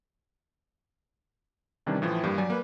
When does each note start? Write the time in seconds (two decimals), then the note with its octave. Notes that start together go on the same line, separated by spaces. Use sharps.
1.86 C3 D#3 E3 G3 C#4 D4
2.02 A2 E3 F3
2.23 G2 G3 A#3
2.38 F#3 D5 G#5
2.50 A#3 B4